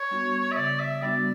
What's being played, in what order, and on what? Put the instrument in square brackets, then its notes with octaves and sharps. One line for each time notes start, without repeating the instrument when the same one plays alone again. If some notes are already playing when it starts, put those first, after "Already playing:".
Already playing: [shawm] C#5
[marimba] G3 B3 D4 F#4
[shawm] E5
[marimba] C#3 [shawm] D5
[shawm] E5
[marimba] G3 B3 D4 F#4 [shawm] D5